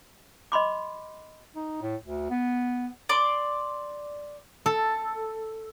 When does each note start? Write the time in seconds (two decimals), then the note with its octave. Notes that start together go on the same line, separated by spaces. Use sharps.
0.52 D#5 B5 C6 D6
1.56 D#4
1.82 A2
2.04 D2
2.30 B3
3.09 D5 C6 D6
4.66 A4